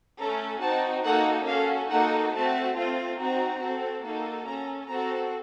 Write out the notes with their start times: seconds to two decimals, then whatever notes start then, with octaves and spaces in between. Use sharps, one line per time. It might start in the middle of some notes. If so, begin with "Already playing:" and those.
0.20 A3 C#4 A4 A#5
0.63 C4 D#4 F#4 A5
1.05 A#3 D#4 F#4 A4 F#5
1.48 C#4 F#4 A4 F5
1.91 A#3 D#4 F#4 A4 F#5
2.34 A3 C4 F#4 A5
2.77 A3 C4 F4
3.19 C4 D#4 F#4 A#5
3.62 C4 F#4 A4
4.04 A#3 D#4 F#4 A4
4.47 C#4 A4 A#5
4.89 C4 F#4 A4 A#5